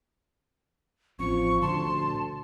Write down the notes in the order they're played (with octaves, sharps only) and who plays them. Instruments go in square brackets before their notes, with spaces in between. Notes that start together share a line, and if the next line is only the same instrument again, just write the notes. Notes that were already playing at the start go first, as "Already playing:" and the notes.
[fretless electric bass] A1 C4 C#4 [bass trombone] F3 [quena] C#6
[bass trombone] D2 [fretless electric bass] A#2 D3 F3 [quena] A5 [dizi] C6